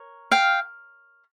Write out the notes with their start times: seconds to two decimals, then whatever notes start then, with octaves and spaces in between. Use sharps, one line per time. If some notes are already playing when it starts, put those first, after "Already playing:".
Already playing: A#4 C#5
0.32 F5 G5